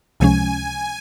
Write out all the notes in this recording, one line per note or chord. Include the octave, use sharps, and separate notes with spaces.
C#2 C3 F3 G#3 C#4 G#5